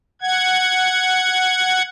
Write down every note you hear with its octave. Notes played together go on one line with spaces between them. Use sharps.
F#5 G#6